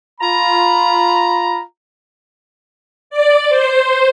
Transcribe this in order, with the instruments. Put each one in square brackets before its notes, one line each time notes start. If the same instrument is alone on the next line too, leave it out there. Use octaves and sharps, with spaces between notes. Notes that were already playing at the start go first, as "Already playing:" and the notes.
[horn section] F4 A#5 B5
[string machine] D5
C5